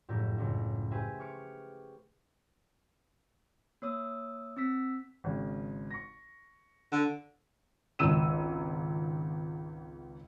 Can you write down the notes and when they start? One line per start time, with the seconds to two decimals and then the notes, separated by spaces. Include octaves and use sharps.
0.09 F#1 F2 A2 G4 A#4 E6
0.38 F#1 C#2
0.91 G4 G#4 B4 C5 E5 G#5
1.20 C#6 D6 F6 C#7
3.82 A#3 C#5 D#6 E6
4.57 C4 E6 B6
5.24 G#1 C#3
5.91 C#6 A#6
6.92 D3
7.99 G#1 C#2 E6 D#7 E7